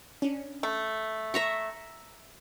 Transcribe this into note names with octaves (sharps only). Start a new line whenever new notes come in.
C#4 D4
A3
E5 A#5 C#6